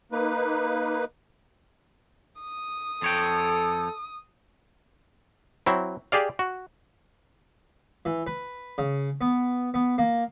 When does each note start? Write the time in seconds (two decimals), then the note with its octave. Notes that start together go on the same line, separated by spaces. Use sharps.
0.12 A#3 D#4 B4
2.41 D#6
3.02 F2 A4 C#5 G5
5.66 F#3 C4 E4
6.12 G4 G#4 D5 F5
6.39 F#4
8.05 E3
8.27 B4
8.78 C#3
9.21 B3
9.74 B3
9.98 A#3